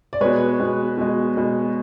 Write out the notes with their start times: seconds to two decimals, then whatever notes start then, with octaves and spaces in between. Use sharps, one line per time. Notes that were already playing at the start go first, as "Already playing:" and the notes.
0.13 D5
0.21 B2 G#3 B4 C#5
0.60 B2 G#3
0.97 B2 G#3
1.37 B2 G#3